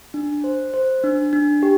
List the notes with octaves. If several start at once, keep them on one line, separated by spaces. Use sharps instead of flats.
D4
C5
C5
D4
D4
G4